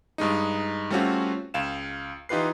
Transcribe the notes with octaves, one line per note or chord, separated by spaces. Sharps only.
G2 G#3 D#4
G3 A3 C4 C#4 F4 F#4
C#2 F5 E7
E3 D#4 F4 G4 B4 C7